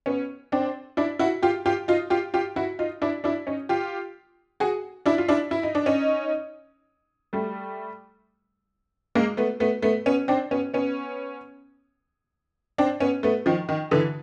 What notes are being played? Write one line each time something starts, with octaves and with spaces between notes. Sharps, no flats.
B3 C#4
C4 D4
D4 E4
E4 F#4
F4 G4
F4 G4
D#4 F4
F4 G4
F4 G4
E4 F#4
D#4 F4
D4 E4
D4 E4
C#4 D#4
F4 G4
F#4 G#4
D4 E4
F4
D4 E4
E4
D#4
D4
C#4 D#4
G3 A3
G#3 A#3
A3 B3
A3 B3
A3 B3
B3 C#4
C4 D4
B3 C#4
B3 C#4
C4 D4
B3 C#4
A3 B3
D#3 F3
D#3
D3 E3